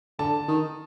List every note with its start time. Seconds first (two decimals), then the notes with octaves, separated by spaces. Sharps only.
0.19 D3 A5
0.48 D#3